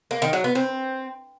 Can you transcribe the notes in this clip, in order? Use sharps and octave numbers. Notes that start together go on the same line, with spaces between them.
A#3
D#3
F#3
B3
C4